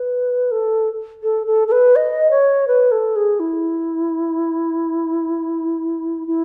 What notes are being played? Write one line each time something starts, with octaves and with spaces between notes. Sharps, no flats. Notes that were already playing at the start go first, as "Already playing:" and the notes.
Already playing: B4
A4
A4
A4
A4
B4
D#5
C#5
B4
A4
G#4
E4
E4